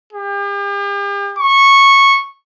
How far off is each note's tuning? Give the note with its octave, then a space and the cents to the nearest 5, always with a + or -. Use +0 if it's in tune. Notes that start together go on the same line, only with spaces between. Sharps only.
G4 +40
C#6 -10